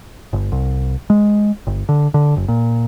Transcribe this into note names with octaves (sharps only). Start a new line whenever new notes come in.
G1
C2
G#3
G1
D3
D3
F#1
A#2